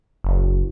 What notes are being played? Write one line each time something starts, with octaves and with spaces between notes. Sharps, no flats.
F#1